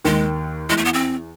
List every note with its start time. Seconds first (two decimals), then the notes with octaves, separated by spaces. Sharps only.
0.05 D#2 D#3 G#3
0.69 E2 E3 G#3
0.77 A3
0.85 B3
0.93 C4